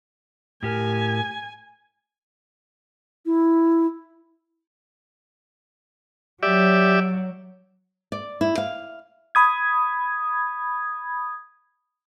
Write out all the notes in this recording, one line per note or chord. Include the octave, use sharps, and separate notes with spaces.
A2 G4 A#4 G#5
E4
F#3 G4 D5 E5
D5
E4
F5
B5 D#6 G#6